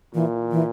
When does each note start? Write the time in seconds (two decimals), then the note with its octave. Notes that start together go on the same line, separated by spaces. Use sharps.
0.14 A#2 E3
0.52 E3